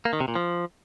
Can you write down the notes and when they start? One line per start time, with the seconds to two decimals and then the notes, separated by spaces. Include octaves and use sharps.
0.05 A#3
0.13 D#3
0.20 C3
0.28 A#2
0.35 F3